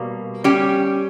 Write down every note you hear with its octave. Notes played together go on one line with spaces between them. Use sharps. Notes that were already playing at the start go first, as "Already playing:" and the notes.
Already playing: B2 G3 A#3
G3 C#4 G4